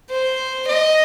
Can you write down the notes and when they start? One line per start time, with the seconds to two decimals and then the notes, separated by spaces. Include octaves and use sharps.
0.10 C5
0.67 D#5